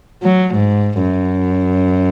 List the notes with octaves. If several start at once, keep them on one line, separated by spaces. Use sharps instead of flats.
F#3
G#2
F#2